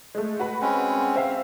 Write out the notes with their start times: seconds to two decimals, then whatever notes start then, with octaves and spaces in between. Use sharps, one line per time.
0.15 G#3 A3
0.39 F#4 B4 B5
0.61 G#3 C4 C#4
1.16 C4 E5 F5